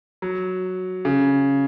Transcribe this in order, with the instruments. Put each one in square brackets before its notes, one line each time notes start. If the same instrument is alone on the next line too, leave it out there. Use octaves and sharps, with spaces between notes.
[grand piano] F#3
C#3